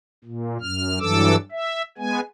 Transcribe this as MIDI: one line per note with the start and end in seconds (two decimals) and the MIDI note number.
0.24 0.57 46
0.61 0.99 42
0.61 0.99 89
1.00 1.36 43
1.00 1.36 52
1.00 1.36 54
1.00 1.36 69
1.00 1.36 86
1.00 1.36 88
1.51 1.82 76
1.98 2.20 56
1.98 2.20 59
1.98 2.20 80